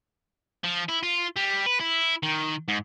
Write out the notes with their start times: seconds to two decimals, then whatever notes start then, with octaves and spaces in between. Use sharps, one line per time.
0.64 F3
0.89 E4
1.03 F4
1.36 G3
1.66 B4
1.81 E4
2.23 D#3
2.68 G#2